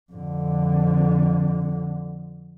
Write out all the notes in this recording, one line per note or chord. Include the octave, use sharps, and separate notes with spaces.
F2 D3